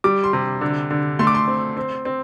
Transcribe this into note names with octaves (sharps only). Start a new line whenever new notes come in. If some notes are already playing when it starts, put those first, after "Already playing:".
G3 D6
C6
C3
D3
D3
A3 C6
D6
C6
C4
C4
C4